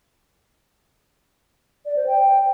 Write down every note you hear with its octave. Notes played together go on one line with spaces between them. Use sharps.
D5
C5
G5